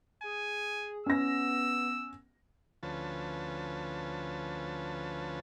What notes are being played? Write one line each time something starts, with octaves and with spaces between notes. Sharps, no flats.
G#4 G#5
B3 C#4 E6 A#6
D2 F3 C#4 B4 A5